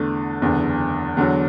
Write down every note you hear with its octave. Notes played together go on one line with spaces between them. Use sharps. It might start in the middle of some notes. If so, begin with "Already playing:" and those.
Already playing: E2 D3 A3
F#1 E2 D3
E2 D3 F#3